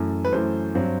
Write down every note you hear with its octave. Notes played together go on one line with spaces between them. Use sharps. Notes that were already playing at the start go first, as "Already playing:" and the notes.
Already playing: F#2 E3 A3
B4
F#2 E3 A3 C5
G2 F#3 C4